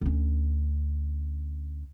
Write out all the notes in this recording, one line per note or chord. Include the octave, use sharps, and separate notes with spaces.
D2 C#4